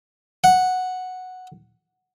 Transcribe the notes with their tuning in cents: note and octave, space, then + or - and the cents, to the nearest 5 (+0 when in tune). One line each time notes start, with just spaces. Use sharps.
F#5 -5